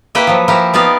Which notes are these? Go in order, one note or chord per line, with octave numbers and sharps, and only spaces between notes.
A#3 E4 G4 B4 G5
F3 F#3
F3 E4 G4 A#4
B3 D#4 G4 D5 F5